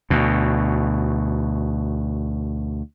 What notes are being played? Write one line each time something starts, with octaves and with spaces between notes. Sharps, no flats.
D2 B2